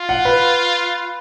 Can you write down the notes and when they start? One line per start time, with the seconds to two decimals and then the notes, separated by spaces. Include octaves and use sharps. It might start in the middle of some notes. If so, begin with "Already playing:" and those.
Already playing: F4
0.09 F#5
0.25 B4